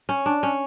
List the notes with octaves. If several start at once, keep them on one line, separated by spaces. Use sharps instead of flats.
C#4
D4
C#4